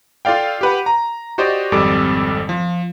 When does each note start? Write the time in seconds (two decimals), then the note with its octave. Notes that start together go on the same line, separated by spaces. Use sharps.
0.25 F4 A4 D5 F5 G5
0.61 G4 B4 F#5
0.86 A#5
1.38 F#4 G4 C5 D5 D#5
1.72 G#1 F2 G3 A4 D6
2.49 F3